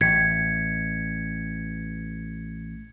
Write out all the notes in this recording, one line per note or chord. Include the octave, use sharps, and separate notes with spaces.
A1 G#6 B6 C#7